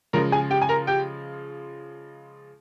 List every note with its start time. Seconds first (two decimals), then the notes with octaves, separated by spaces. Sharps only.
0.13 C#3 F3 G#3 A#4 A#5
0.32 G#4 G#5
0.50 G4 G5
0.62 G#5
0.69 A#4 A#5
0.87 G4 G5